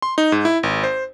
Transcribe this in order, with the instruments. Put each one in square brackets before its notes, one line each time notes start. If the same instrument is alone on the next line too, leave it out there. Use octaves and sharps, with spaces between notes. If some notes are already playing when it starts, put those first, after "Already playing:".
[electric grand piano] C6
D#4
G#2
E4
G#1
C5